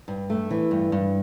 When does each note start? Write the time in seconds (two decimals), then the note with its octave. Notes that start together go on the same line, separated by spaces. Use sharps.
0.08 G2
0.30 A3
0.51 E3
0.71 G2
0.92 G2